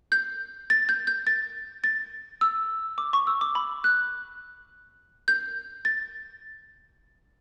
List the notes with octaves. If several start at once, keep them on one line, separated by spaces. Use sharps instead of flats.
G6
A6
G6
G6
A6
A6
E6
D6
C#6
E6
D6
B5
F#6
G6
A6